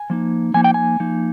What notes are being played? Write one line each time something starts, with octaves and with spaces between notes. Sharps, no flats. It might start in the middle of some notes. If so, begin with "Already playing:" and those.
Already playing: G#5
F3 A#3 D#4
F3 A#3 D#4 G#5
G5
G#5
F3 A#3 D#4